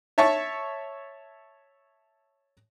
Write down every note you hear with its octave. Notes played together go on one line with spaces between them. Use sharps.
C#5 E5 A5 C#6